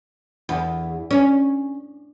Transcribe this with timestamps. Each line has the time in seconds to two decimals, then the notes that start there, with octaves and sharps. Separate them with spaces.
0.49 E2
1.11 C#4